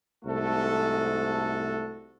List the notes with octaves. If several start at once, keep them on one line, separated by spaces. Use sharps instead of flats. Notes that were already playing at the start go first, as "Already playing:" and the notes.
C2 G#2 A3 F#4 A4